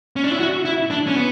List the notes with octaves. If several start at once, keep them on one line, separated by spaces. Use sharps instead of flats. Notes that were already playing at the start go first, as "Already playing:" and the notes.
C#4
D4
E4
F#4
E4
D4
C#4
B3